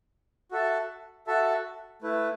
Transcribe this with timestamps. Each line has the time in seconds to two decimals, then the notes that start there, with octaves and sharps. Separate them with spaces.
0.52 F#4 A4 E5 A5
1.27 F#4 A4 E5 A5
2.02 A3 E4 B4